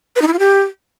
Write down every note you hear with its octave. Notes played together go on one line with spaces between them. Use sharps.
B4
D#4
E4
F4
G4